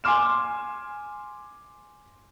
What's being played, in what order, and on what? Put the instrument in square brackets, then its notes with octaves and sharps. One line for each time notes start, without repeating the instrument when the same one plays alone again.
[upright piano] G#5 C6 D6 F6 E7